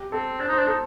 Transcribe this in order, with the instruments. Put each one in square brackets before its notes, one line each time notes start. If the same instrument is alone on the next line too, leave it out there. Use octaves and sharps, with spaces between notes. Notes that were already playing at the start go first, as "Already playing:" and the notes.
Already playing: [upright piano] G4
[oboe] C4 [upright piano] A4
[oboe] D4 [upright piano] C5
[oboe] D#4
[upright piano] C5
[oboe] D4
[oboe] D#4 [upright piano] A4